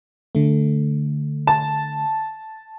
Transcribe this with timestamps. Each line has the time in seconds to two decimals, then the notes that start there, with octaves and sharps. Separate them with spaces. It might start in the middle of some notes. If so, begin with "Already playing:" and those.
0.35 D3 A3
1.47 A5